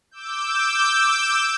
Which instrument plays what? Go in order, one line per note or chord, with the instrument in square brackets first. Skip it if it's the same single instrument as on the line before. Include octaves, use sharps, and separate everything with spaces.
[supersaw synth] D6 E6 G6